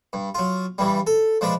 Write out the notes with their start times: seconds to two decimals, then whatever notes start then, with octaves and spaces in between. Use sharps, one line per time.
0.13 G2
0.35 F#3 F4
0.78 G2 E3 G3
1.07 A4
1.41 F3 G#3 D4 B4